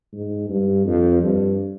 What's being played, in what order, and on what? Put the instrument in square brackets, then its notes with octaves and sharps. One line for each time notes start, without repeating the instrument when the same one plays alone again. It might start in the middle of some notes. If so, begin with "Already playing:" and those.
[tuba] G#2
G2
F2
G2